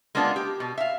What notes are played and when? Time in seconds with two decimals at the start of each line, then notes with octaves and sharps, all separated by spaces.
0.15 G#3 A#3 B3 D4 F4
0.36 G4
0.60 B2
0.78 E5 F5